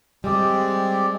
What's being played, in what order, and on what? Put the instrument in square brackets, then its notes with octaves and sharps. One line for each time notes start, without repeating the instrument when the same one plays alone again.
[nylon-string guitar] G3 [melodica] G#3 C4 G4 D5